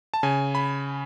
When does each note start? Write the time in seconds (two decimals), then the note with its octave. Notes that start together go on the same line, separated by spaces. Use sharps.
0.14 A5
0.23 C#3 G#5
0.55 B5